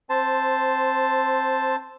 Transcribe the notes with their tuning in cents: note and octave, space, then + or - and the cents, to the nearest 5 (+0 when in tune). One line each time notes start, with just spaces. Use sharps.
C4 +15 C5 -5 A5 +0